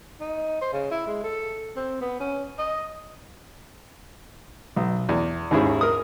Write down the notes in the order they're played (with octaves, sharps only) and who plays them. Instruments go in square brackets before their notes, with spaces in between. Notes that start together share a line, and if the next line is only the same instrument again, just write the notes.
[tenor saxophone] D#4
C5
C#3
E4
G#3
A4
C4
B3
C#4
D#5
[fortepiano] B1
E2
D#2 G#2 C#4 E4 G#4
A#4 D#6